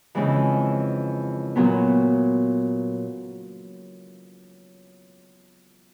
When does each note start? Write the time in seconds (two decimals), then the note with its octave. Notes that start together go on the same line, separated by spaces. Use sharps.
0.15 F2 C#3 E3 G#3
1.56 A#2 F#3 B3